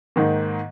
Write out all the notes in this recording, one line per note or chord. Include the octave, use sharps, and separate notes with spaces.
G#2 D#3 A#3